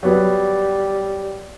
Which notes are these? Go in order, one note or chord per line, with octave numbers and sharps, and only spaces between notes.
F#3 G3 B3